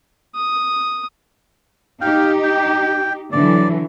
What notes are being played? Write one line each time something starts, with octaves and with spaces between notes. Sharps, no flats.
D#6
D#4 G4 F5 G5
G5
D3 E3 F#3 D5